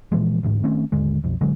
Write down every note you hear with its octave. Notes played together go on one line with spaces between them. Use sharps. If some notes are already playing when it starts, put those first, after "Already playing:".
A#2 E3 F3 G#3
A1 D2 G#2
D#3 A3 C4 C#4
G#1 D#2 D3 G#3
B1 F2
D1 D3 F#3 G#3